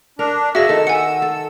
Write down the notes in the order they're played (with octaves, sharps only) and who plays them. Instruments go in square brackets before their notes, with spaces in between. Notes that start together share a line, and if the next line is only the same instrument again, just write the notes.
[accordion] D4 [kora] A#4
[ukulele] F#4 G#4 F5 [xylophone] E5 A#6 [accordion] E6
[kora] D#3 [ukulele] A4
[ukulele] F#5 [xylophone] G#5 C#7
[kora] A4